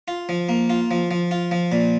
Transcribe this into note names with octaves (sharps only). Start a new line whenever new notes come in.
F4
F3
A#3
F4
F3
F3
F4
F3
A#2